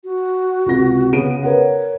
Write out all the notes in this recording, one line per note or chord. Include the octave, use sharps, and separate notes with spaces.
F#4
C#2 C3 A#6
C#3 B3 D7 D#7
A#4 B4 C#5 F#5